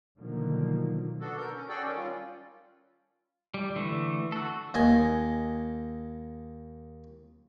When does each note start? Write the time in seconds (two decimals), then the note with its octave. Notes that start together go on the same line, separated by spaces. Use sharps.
0.19 B2 D3 D#3 F3 F#3 A#3
1.21 B3 D4 F#4 A4
1.37 A#4 G6
1.55 C#4
1.69 F#4 G#4 A4 D5 G5
1.83 D#3 C#4
1.96 G3 F4
3.54 G3
3.76 D3 E3 A3
4.32 F#4 A4
4.74 D#2 D#5 G#5